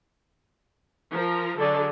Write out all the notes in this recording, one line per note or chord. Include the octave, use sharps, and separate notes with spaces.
F3 A#4 A#5
D3 F#3 G#4 A4 D5